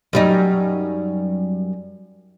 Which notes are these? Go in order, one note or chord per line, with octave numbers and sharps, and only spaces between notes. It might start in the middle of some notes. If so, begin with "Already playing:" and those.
F#2 G3 D#4